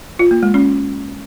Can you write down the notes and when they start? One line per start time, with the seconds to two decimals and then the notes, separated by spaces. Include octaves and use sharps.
0.19 F4
0.31 A#3
0.43 G#3
0.54 C#4